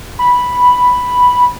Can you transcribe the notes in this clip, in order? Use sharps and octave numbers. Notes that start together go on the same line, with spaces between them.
B5